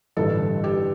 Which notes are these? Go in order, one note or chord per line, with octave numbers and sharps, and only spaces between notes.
A1 G2 D3 A4
G4